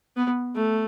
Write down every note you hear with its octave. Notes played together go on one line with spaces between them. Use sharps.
B3
A3